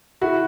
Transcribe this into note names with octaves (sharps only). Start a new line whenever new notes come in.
E4 F#4